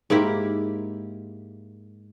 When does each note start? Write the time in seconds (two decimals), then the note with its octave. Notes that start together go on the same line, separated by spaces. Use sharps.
0.10 G#2 A#3 E4 G4